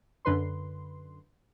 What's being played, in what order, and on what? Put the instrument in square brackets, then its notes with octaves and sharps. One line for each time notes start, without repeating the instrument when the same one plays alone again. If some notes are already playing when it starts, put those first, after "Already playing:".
[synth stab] F#2 D3 B4 C6